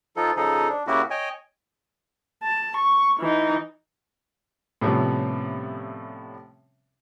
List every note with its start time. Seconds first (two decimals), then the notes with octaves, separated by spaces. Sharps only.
0.16 F3 D#4 F4 A4
0.37 C#3 F3 D#4 G#4 A4
0.69 D4
0.87 C#3 A#3 C#4 E4 F#4 G4
1.11 C#5 D#5 G5 G#5
2.43 A5
2.76 C#6
3.20 E3 D#4
4.81 A2 C3 F3 G3 B3 C#4